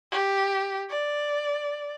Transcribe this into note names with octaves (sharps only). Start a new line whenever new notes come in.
G4
D5